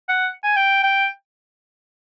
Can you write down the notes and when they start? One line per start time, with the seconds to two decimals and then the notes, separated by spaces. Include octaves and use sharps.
0.09 F#5
0.44 G#5
0.56 G5
0.83 G5